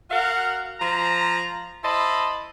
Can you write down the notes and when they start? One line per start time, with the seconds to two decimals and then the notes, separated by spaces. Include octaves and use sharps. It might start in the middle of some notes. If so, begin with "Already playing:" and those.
0.10 F#4 A#4 F5 F#5
0.80 F3 C5 A#5
1.83 E4 C5 D#5 A5 B5